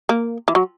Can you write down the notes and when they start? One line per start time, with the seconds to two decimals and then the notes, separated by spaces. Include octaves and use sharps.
0.09 A#3
0.48 E3
0.55 F#3